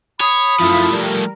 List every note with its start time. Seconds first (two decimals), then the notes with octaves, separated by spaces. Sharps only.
0.21 C#5 B5 D#6
0.60 F#2 F3 A3 E4 F4
0.90 G3 A#4